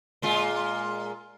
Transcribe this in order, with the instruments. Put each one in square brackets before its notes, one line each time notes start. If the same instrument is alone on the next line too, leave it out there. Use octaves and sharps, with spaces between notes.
[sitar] A#2 G#3 F4